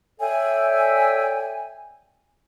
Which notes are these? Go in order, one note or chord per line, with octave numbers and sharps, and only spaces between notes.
A4 C#5 D5 E5 G5 G#5